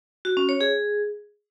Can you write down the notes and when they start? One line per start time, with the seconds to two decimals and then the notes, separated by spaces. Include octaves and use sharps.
0.25 F#4
0.37 C#4
0.49 C#5
0.61 G#4